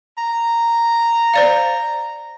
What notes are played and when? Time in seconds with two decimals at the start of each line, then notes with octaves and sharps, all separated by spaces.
0.18 A#5
1.34 C5 D5 F5